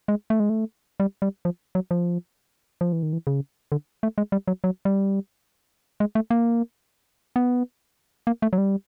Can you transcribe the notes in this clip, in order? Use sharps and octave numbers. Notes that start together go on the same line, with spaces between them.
G#3
A3
G#3
A3
G3
G3
F3
F#3
F3
F3
E3
D#3
E3
C#3
D3
A3
G#3
G3
F#3
F#3
G3
G#3
A3
A#3
B3
A#3
A3
F#3
G3